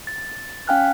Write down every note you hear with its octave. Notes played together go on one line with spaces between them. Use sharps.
A6
C#4 F5 G5 G#5 F6 F#6